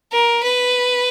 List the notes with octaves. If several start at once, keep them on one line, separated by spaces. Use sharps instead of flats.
A#4
B4